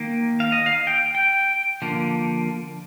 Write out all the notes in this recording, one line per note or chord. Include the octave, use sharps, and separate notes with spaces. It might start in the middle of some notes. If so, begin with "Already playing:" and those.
Already playing: D#3 A#3
F5
D#5
F5
G5
G5
D3 F3 A#3